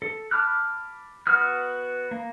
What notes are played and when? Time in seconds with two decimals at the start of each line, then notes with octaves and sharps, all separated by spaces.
0.02 A4
0.31 A5 B5 D6 F6 F#6
1.27 B3 F#4 B4 D#6 F6
2.11 A#3